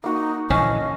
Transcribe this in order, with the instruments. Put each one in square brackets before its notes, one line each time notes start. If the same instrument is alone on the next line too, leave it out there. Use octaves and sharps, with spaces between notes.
[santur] A#3 F#4 [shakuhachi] D#4
[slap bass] A#1 D3 E3 [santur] C#4 F5 A5 [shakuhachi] D#5